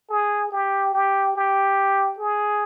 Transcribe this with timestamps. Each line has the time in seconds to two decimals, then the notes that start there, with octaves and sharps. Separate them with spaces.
0.10 G#4
0.52 G4
0.94 G4
1.36 G4
2.19 G#4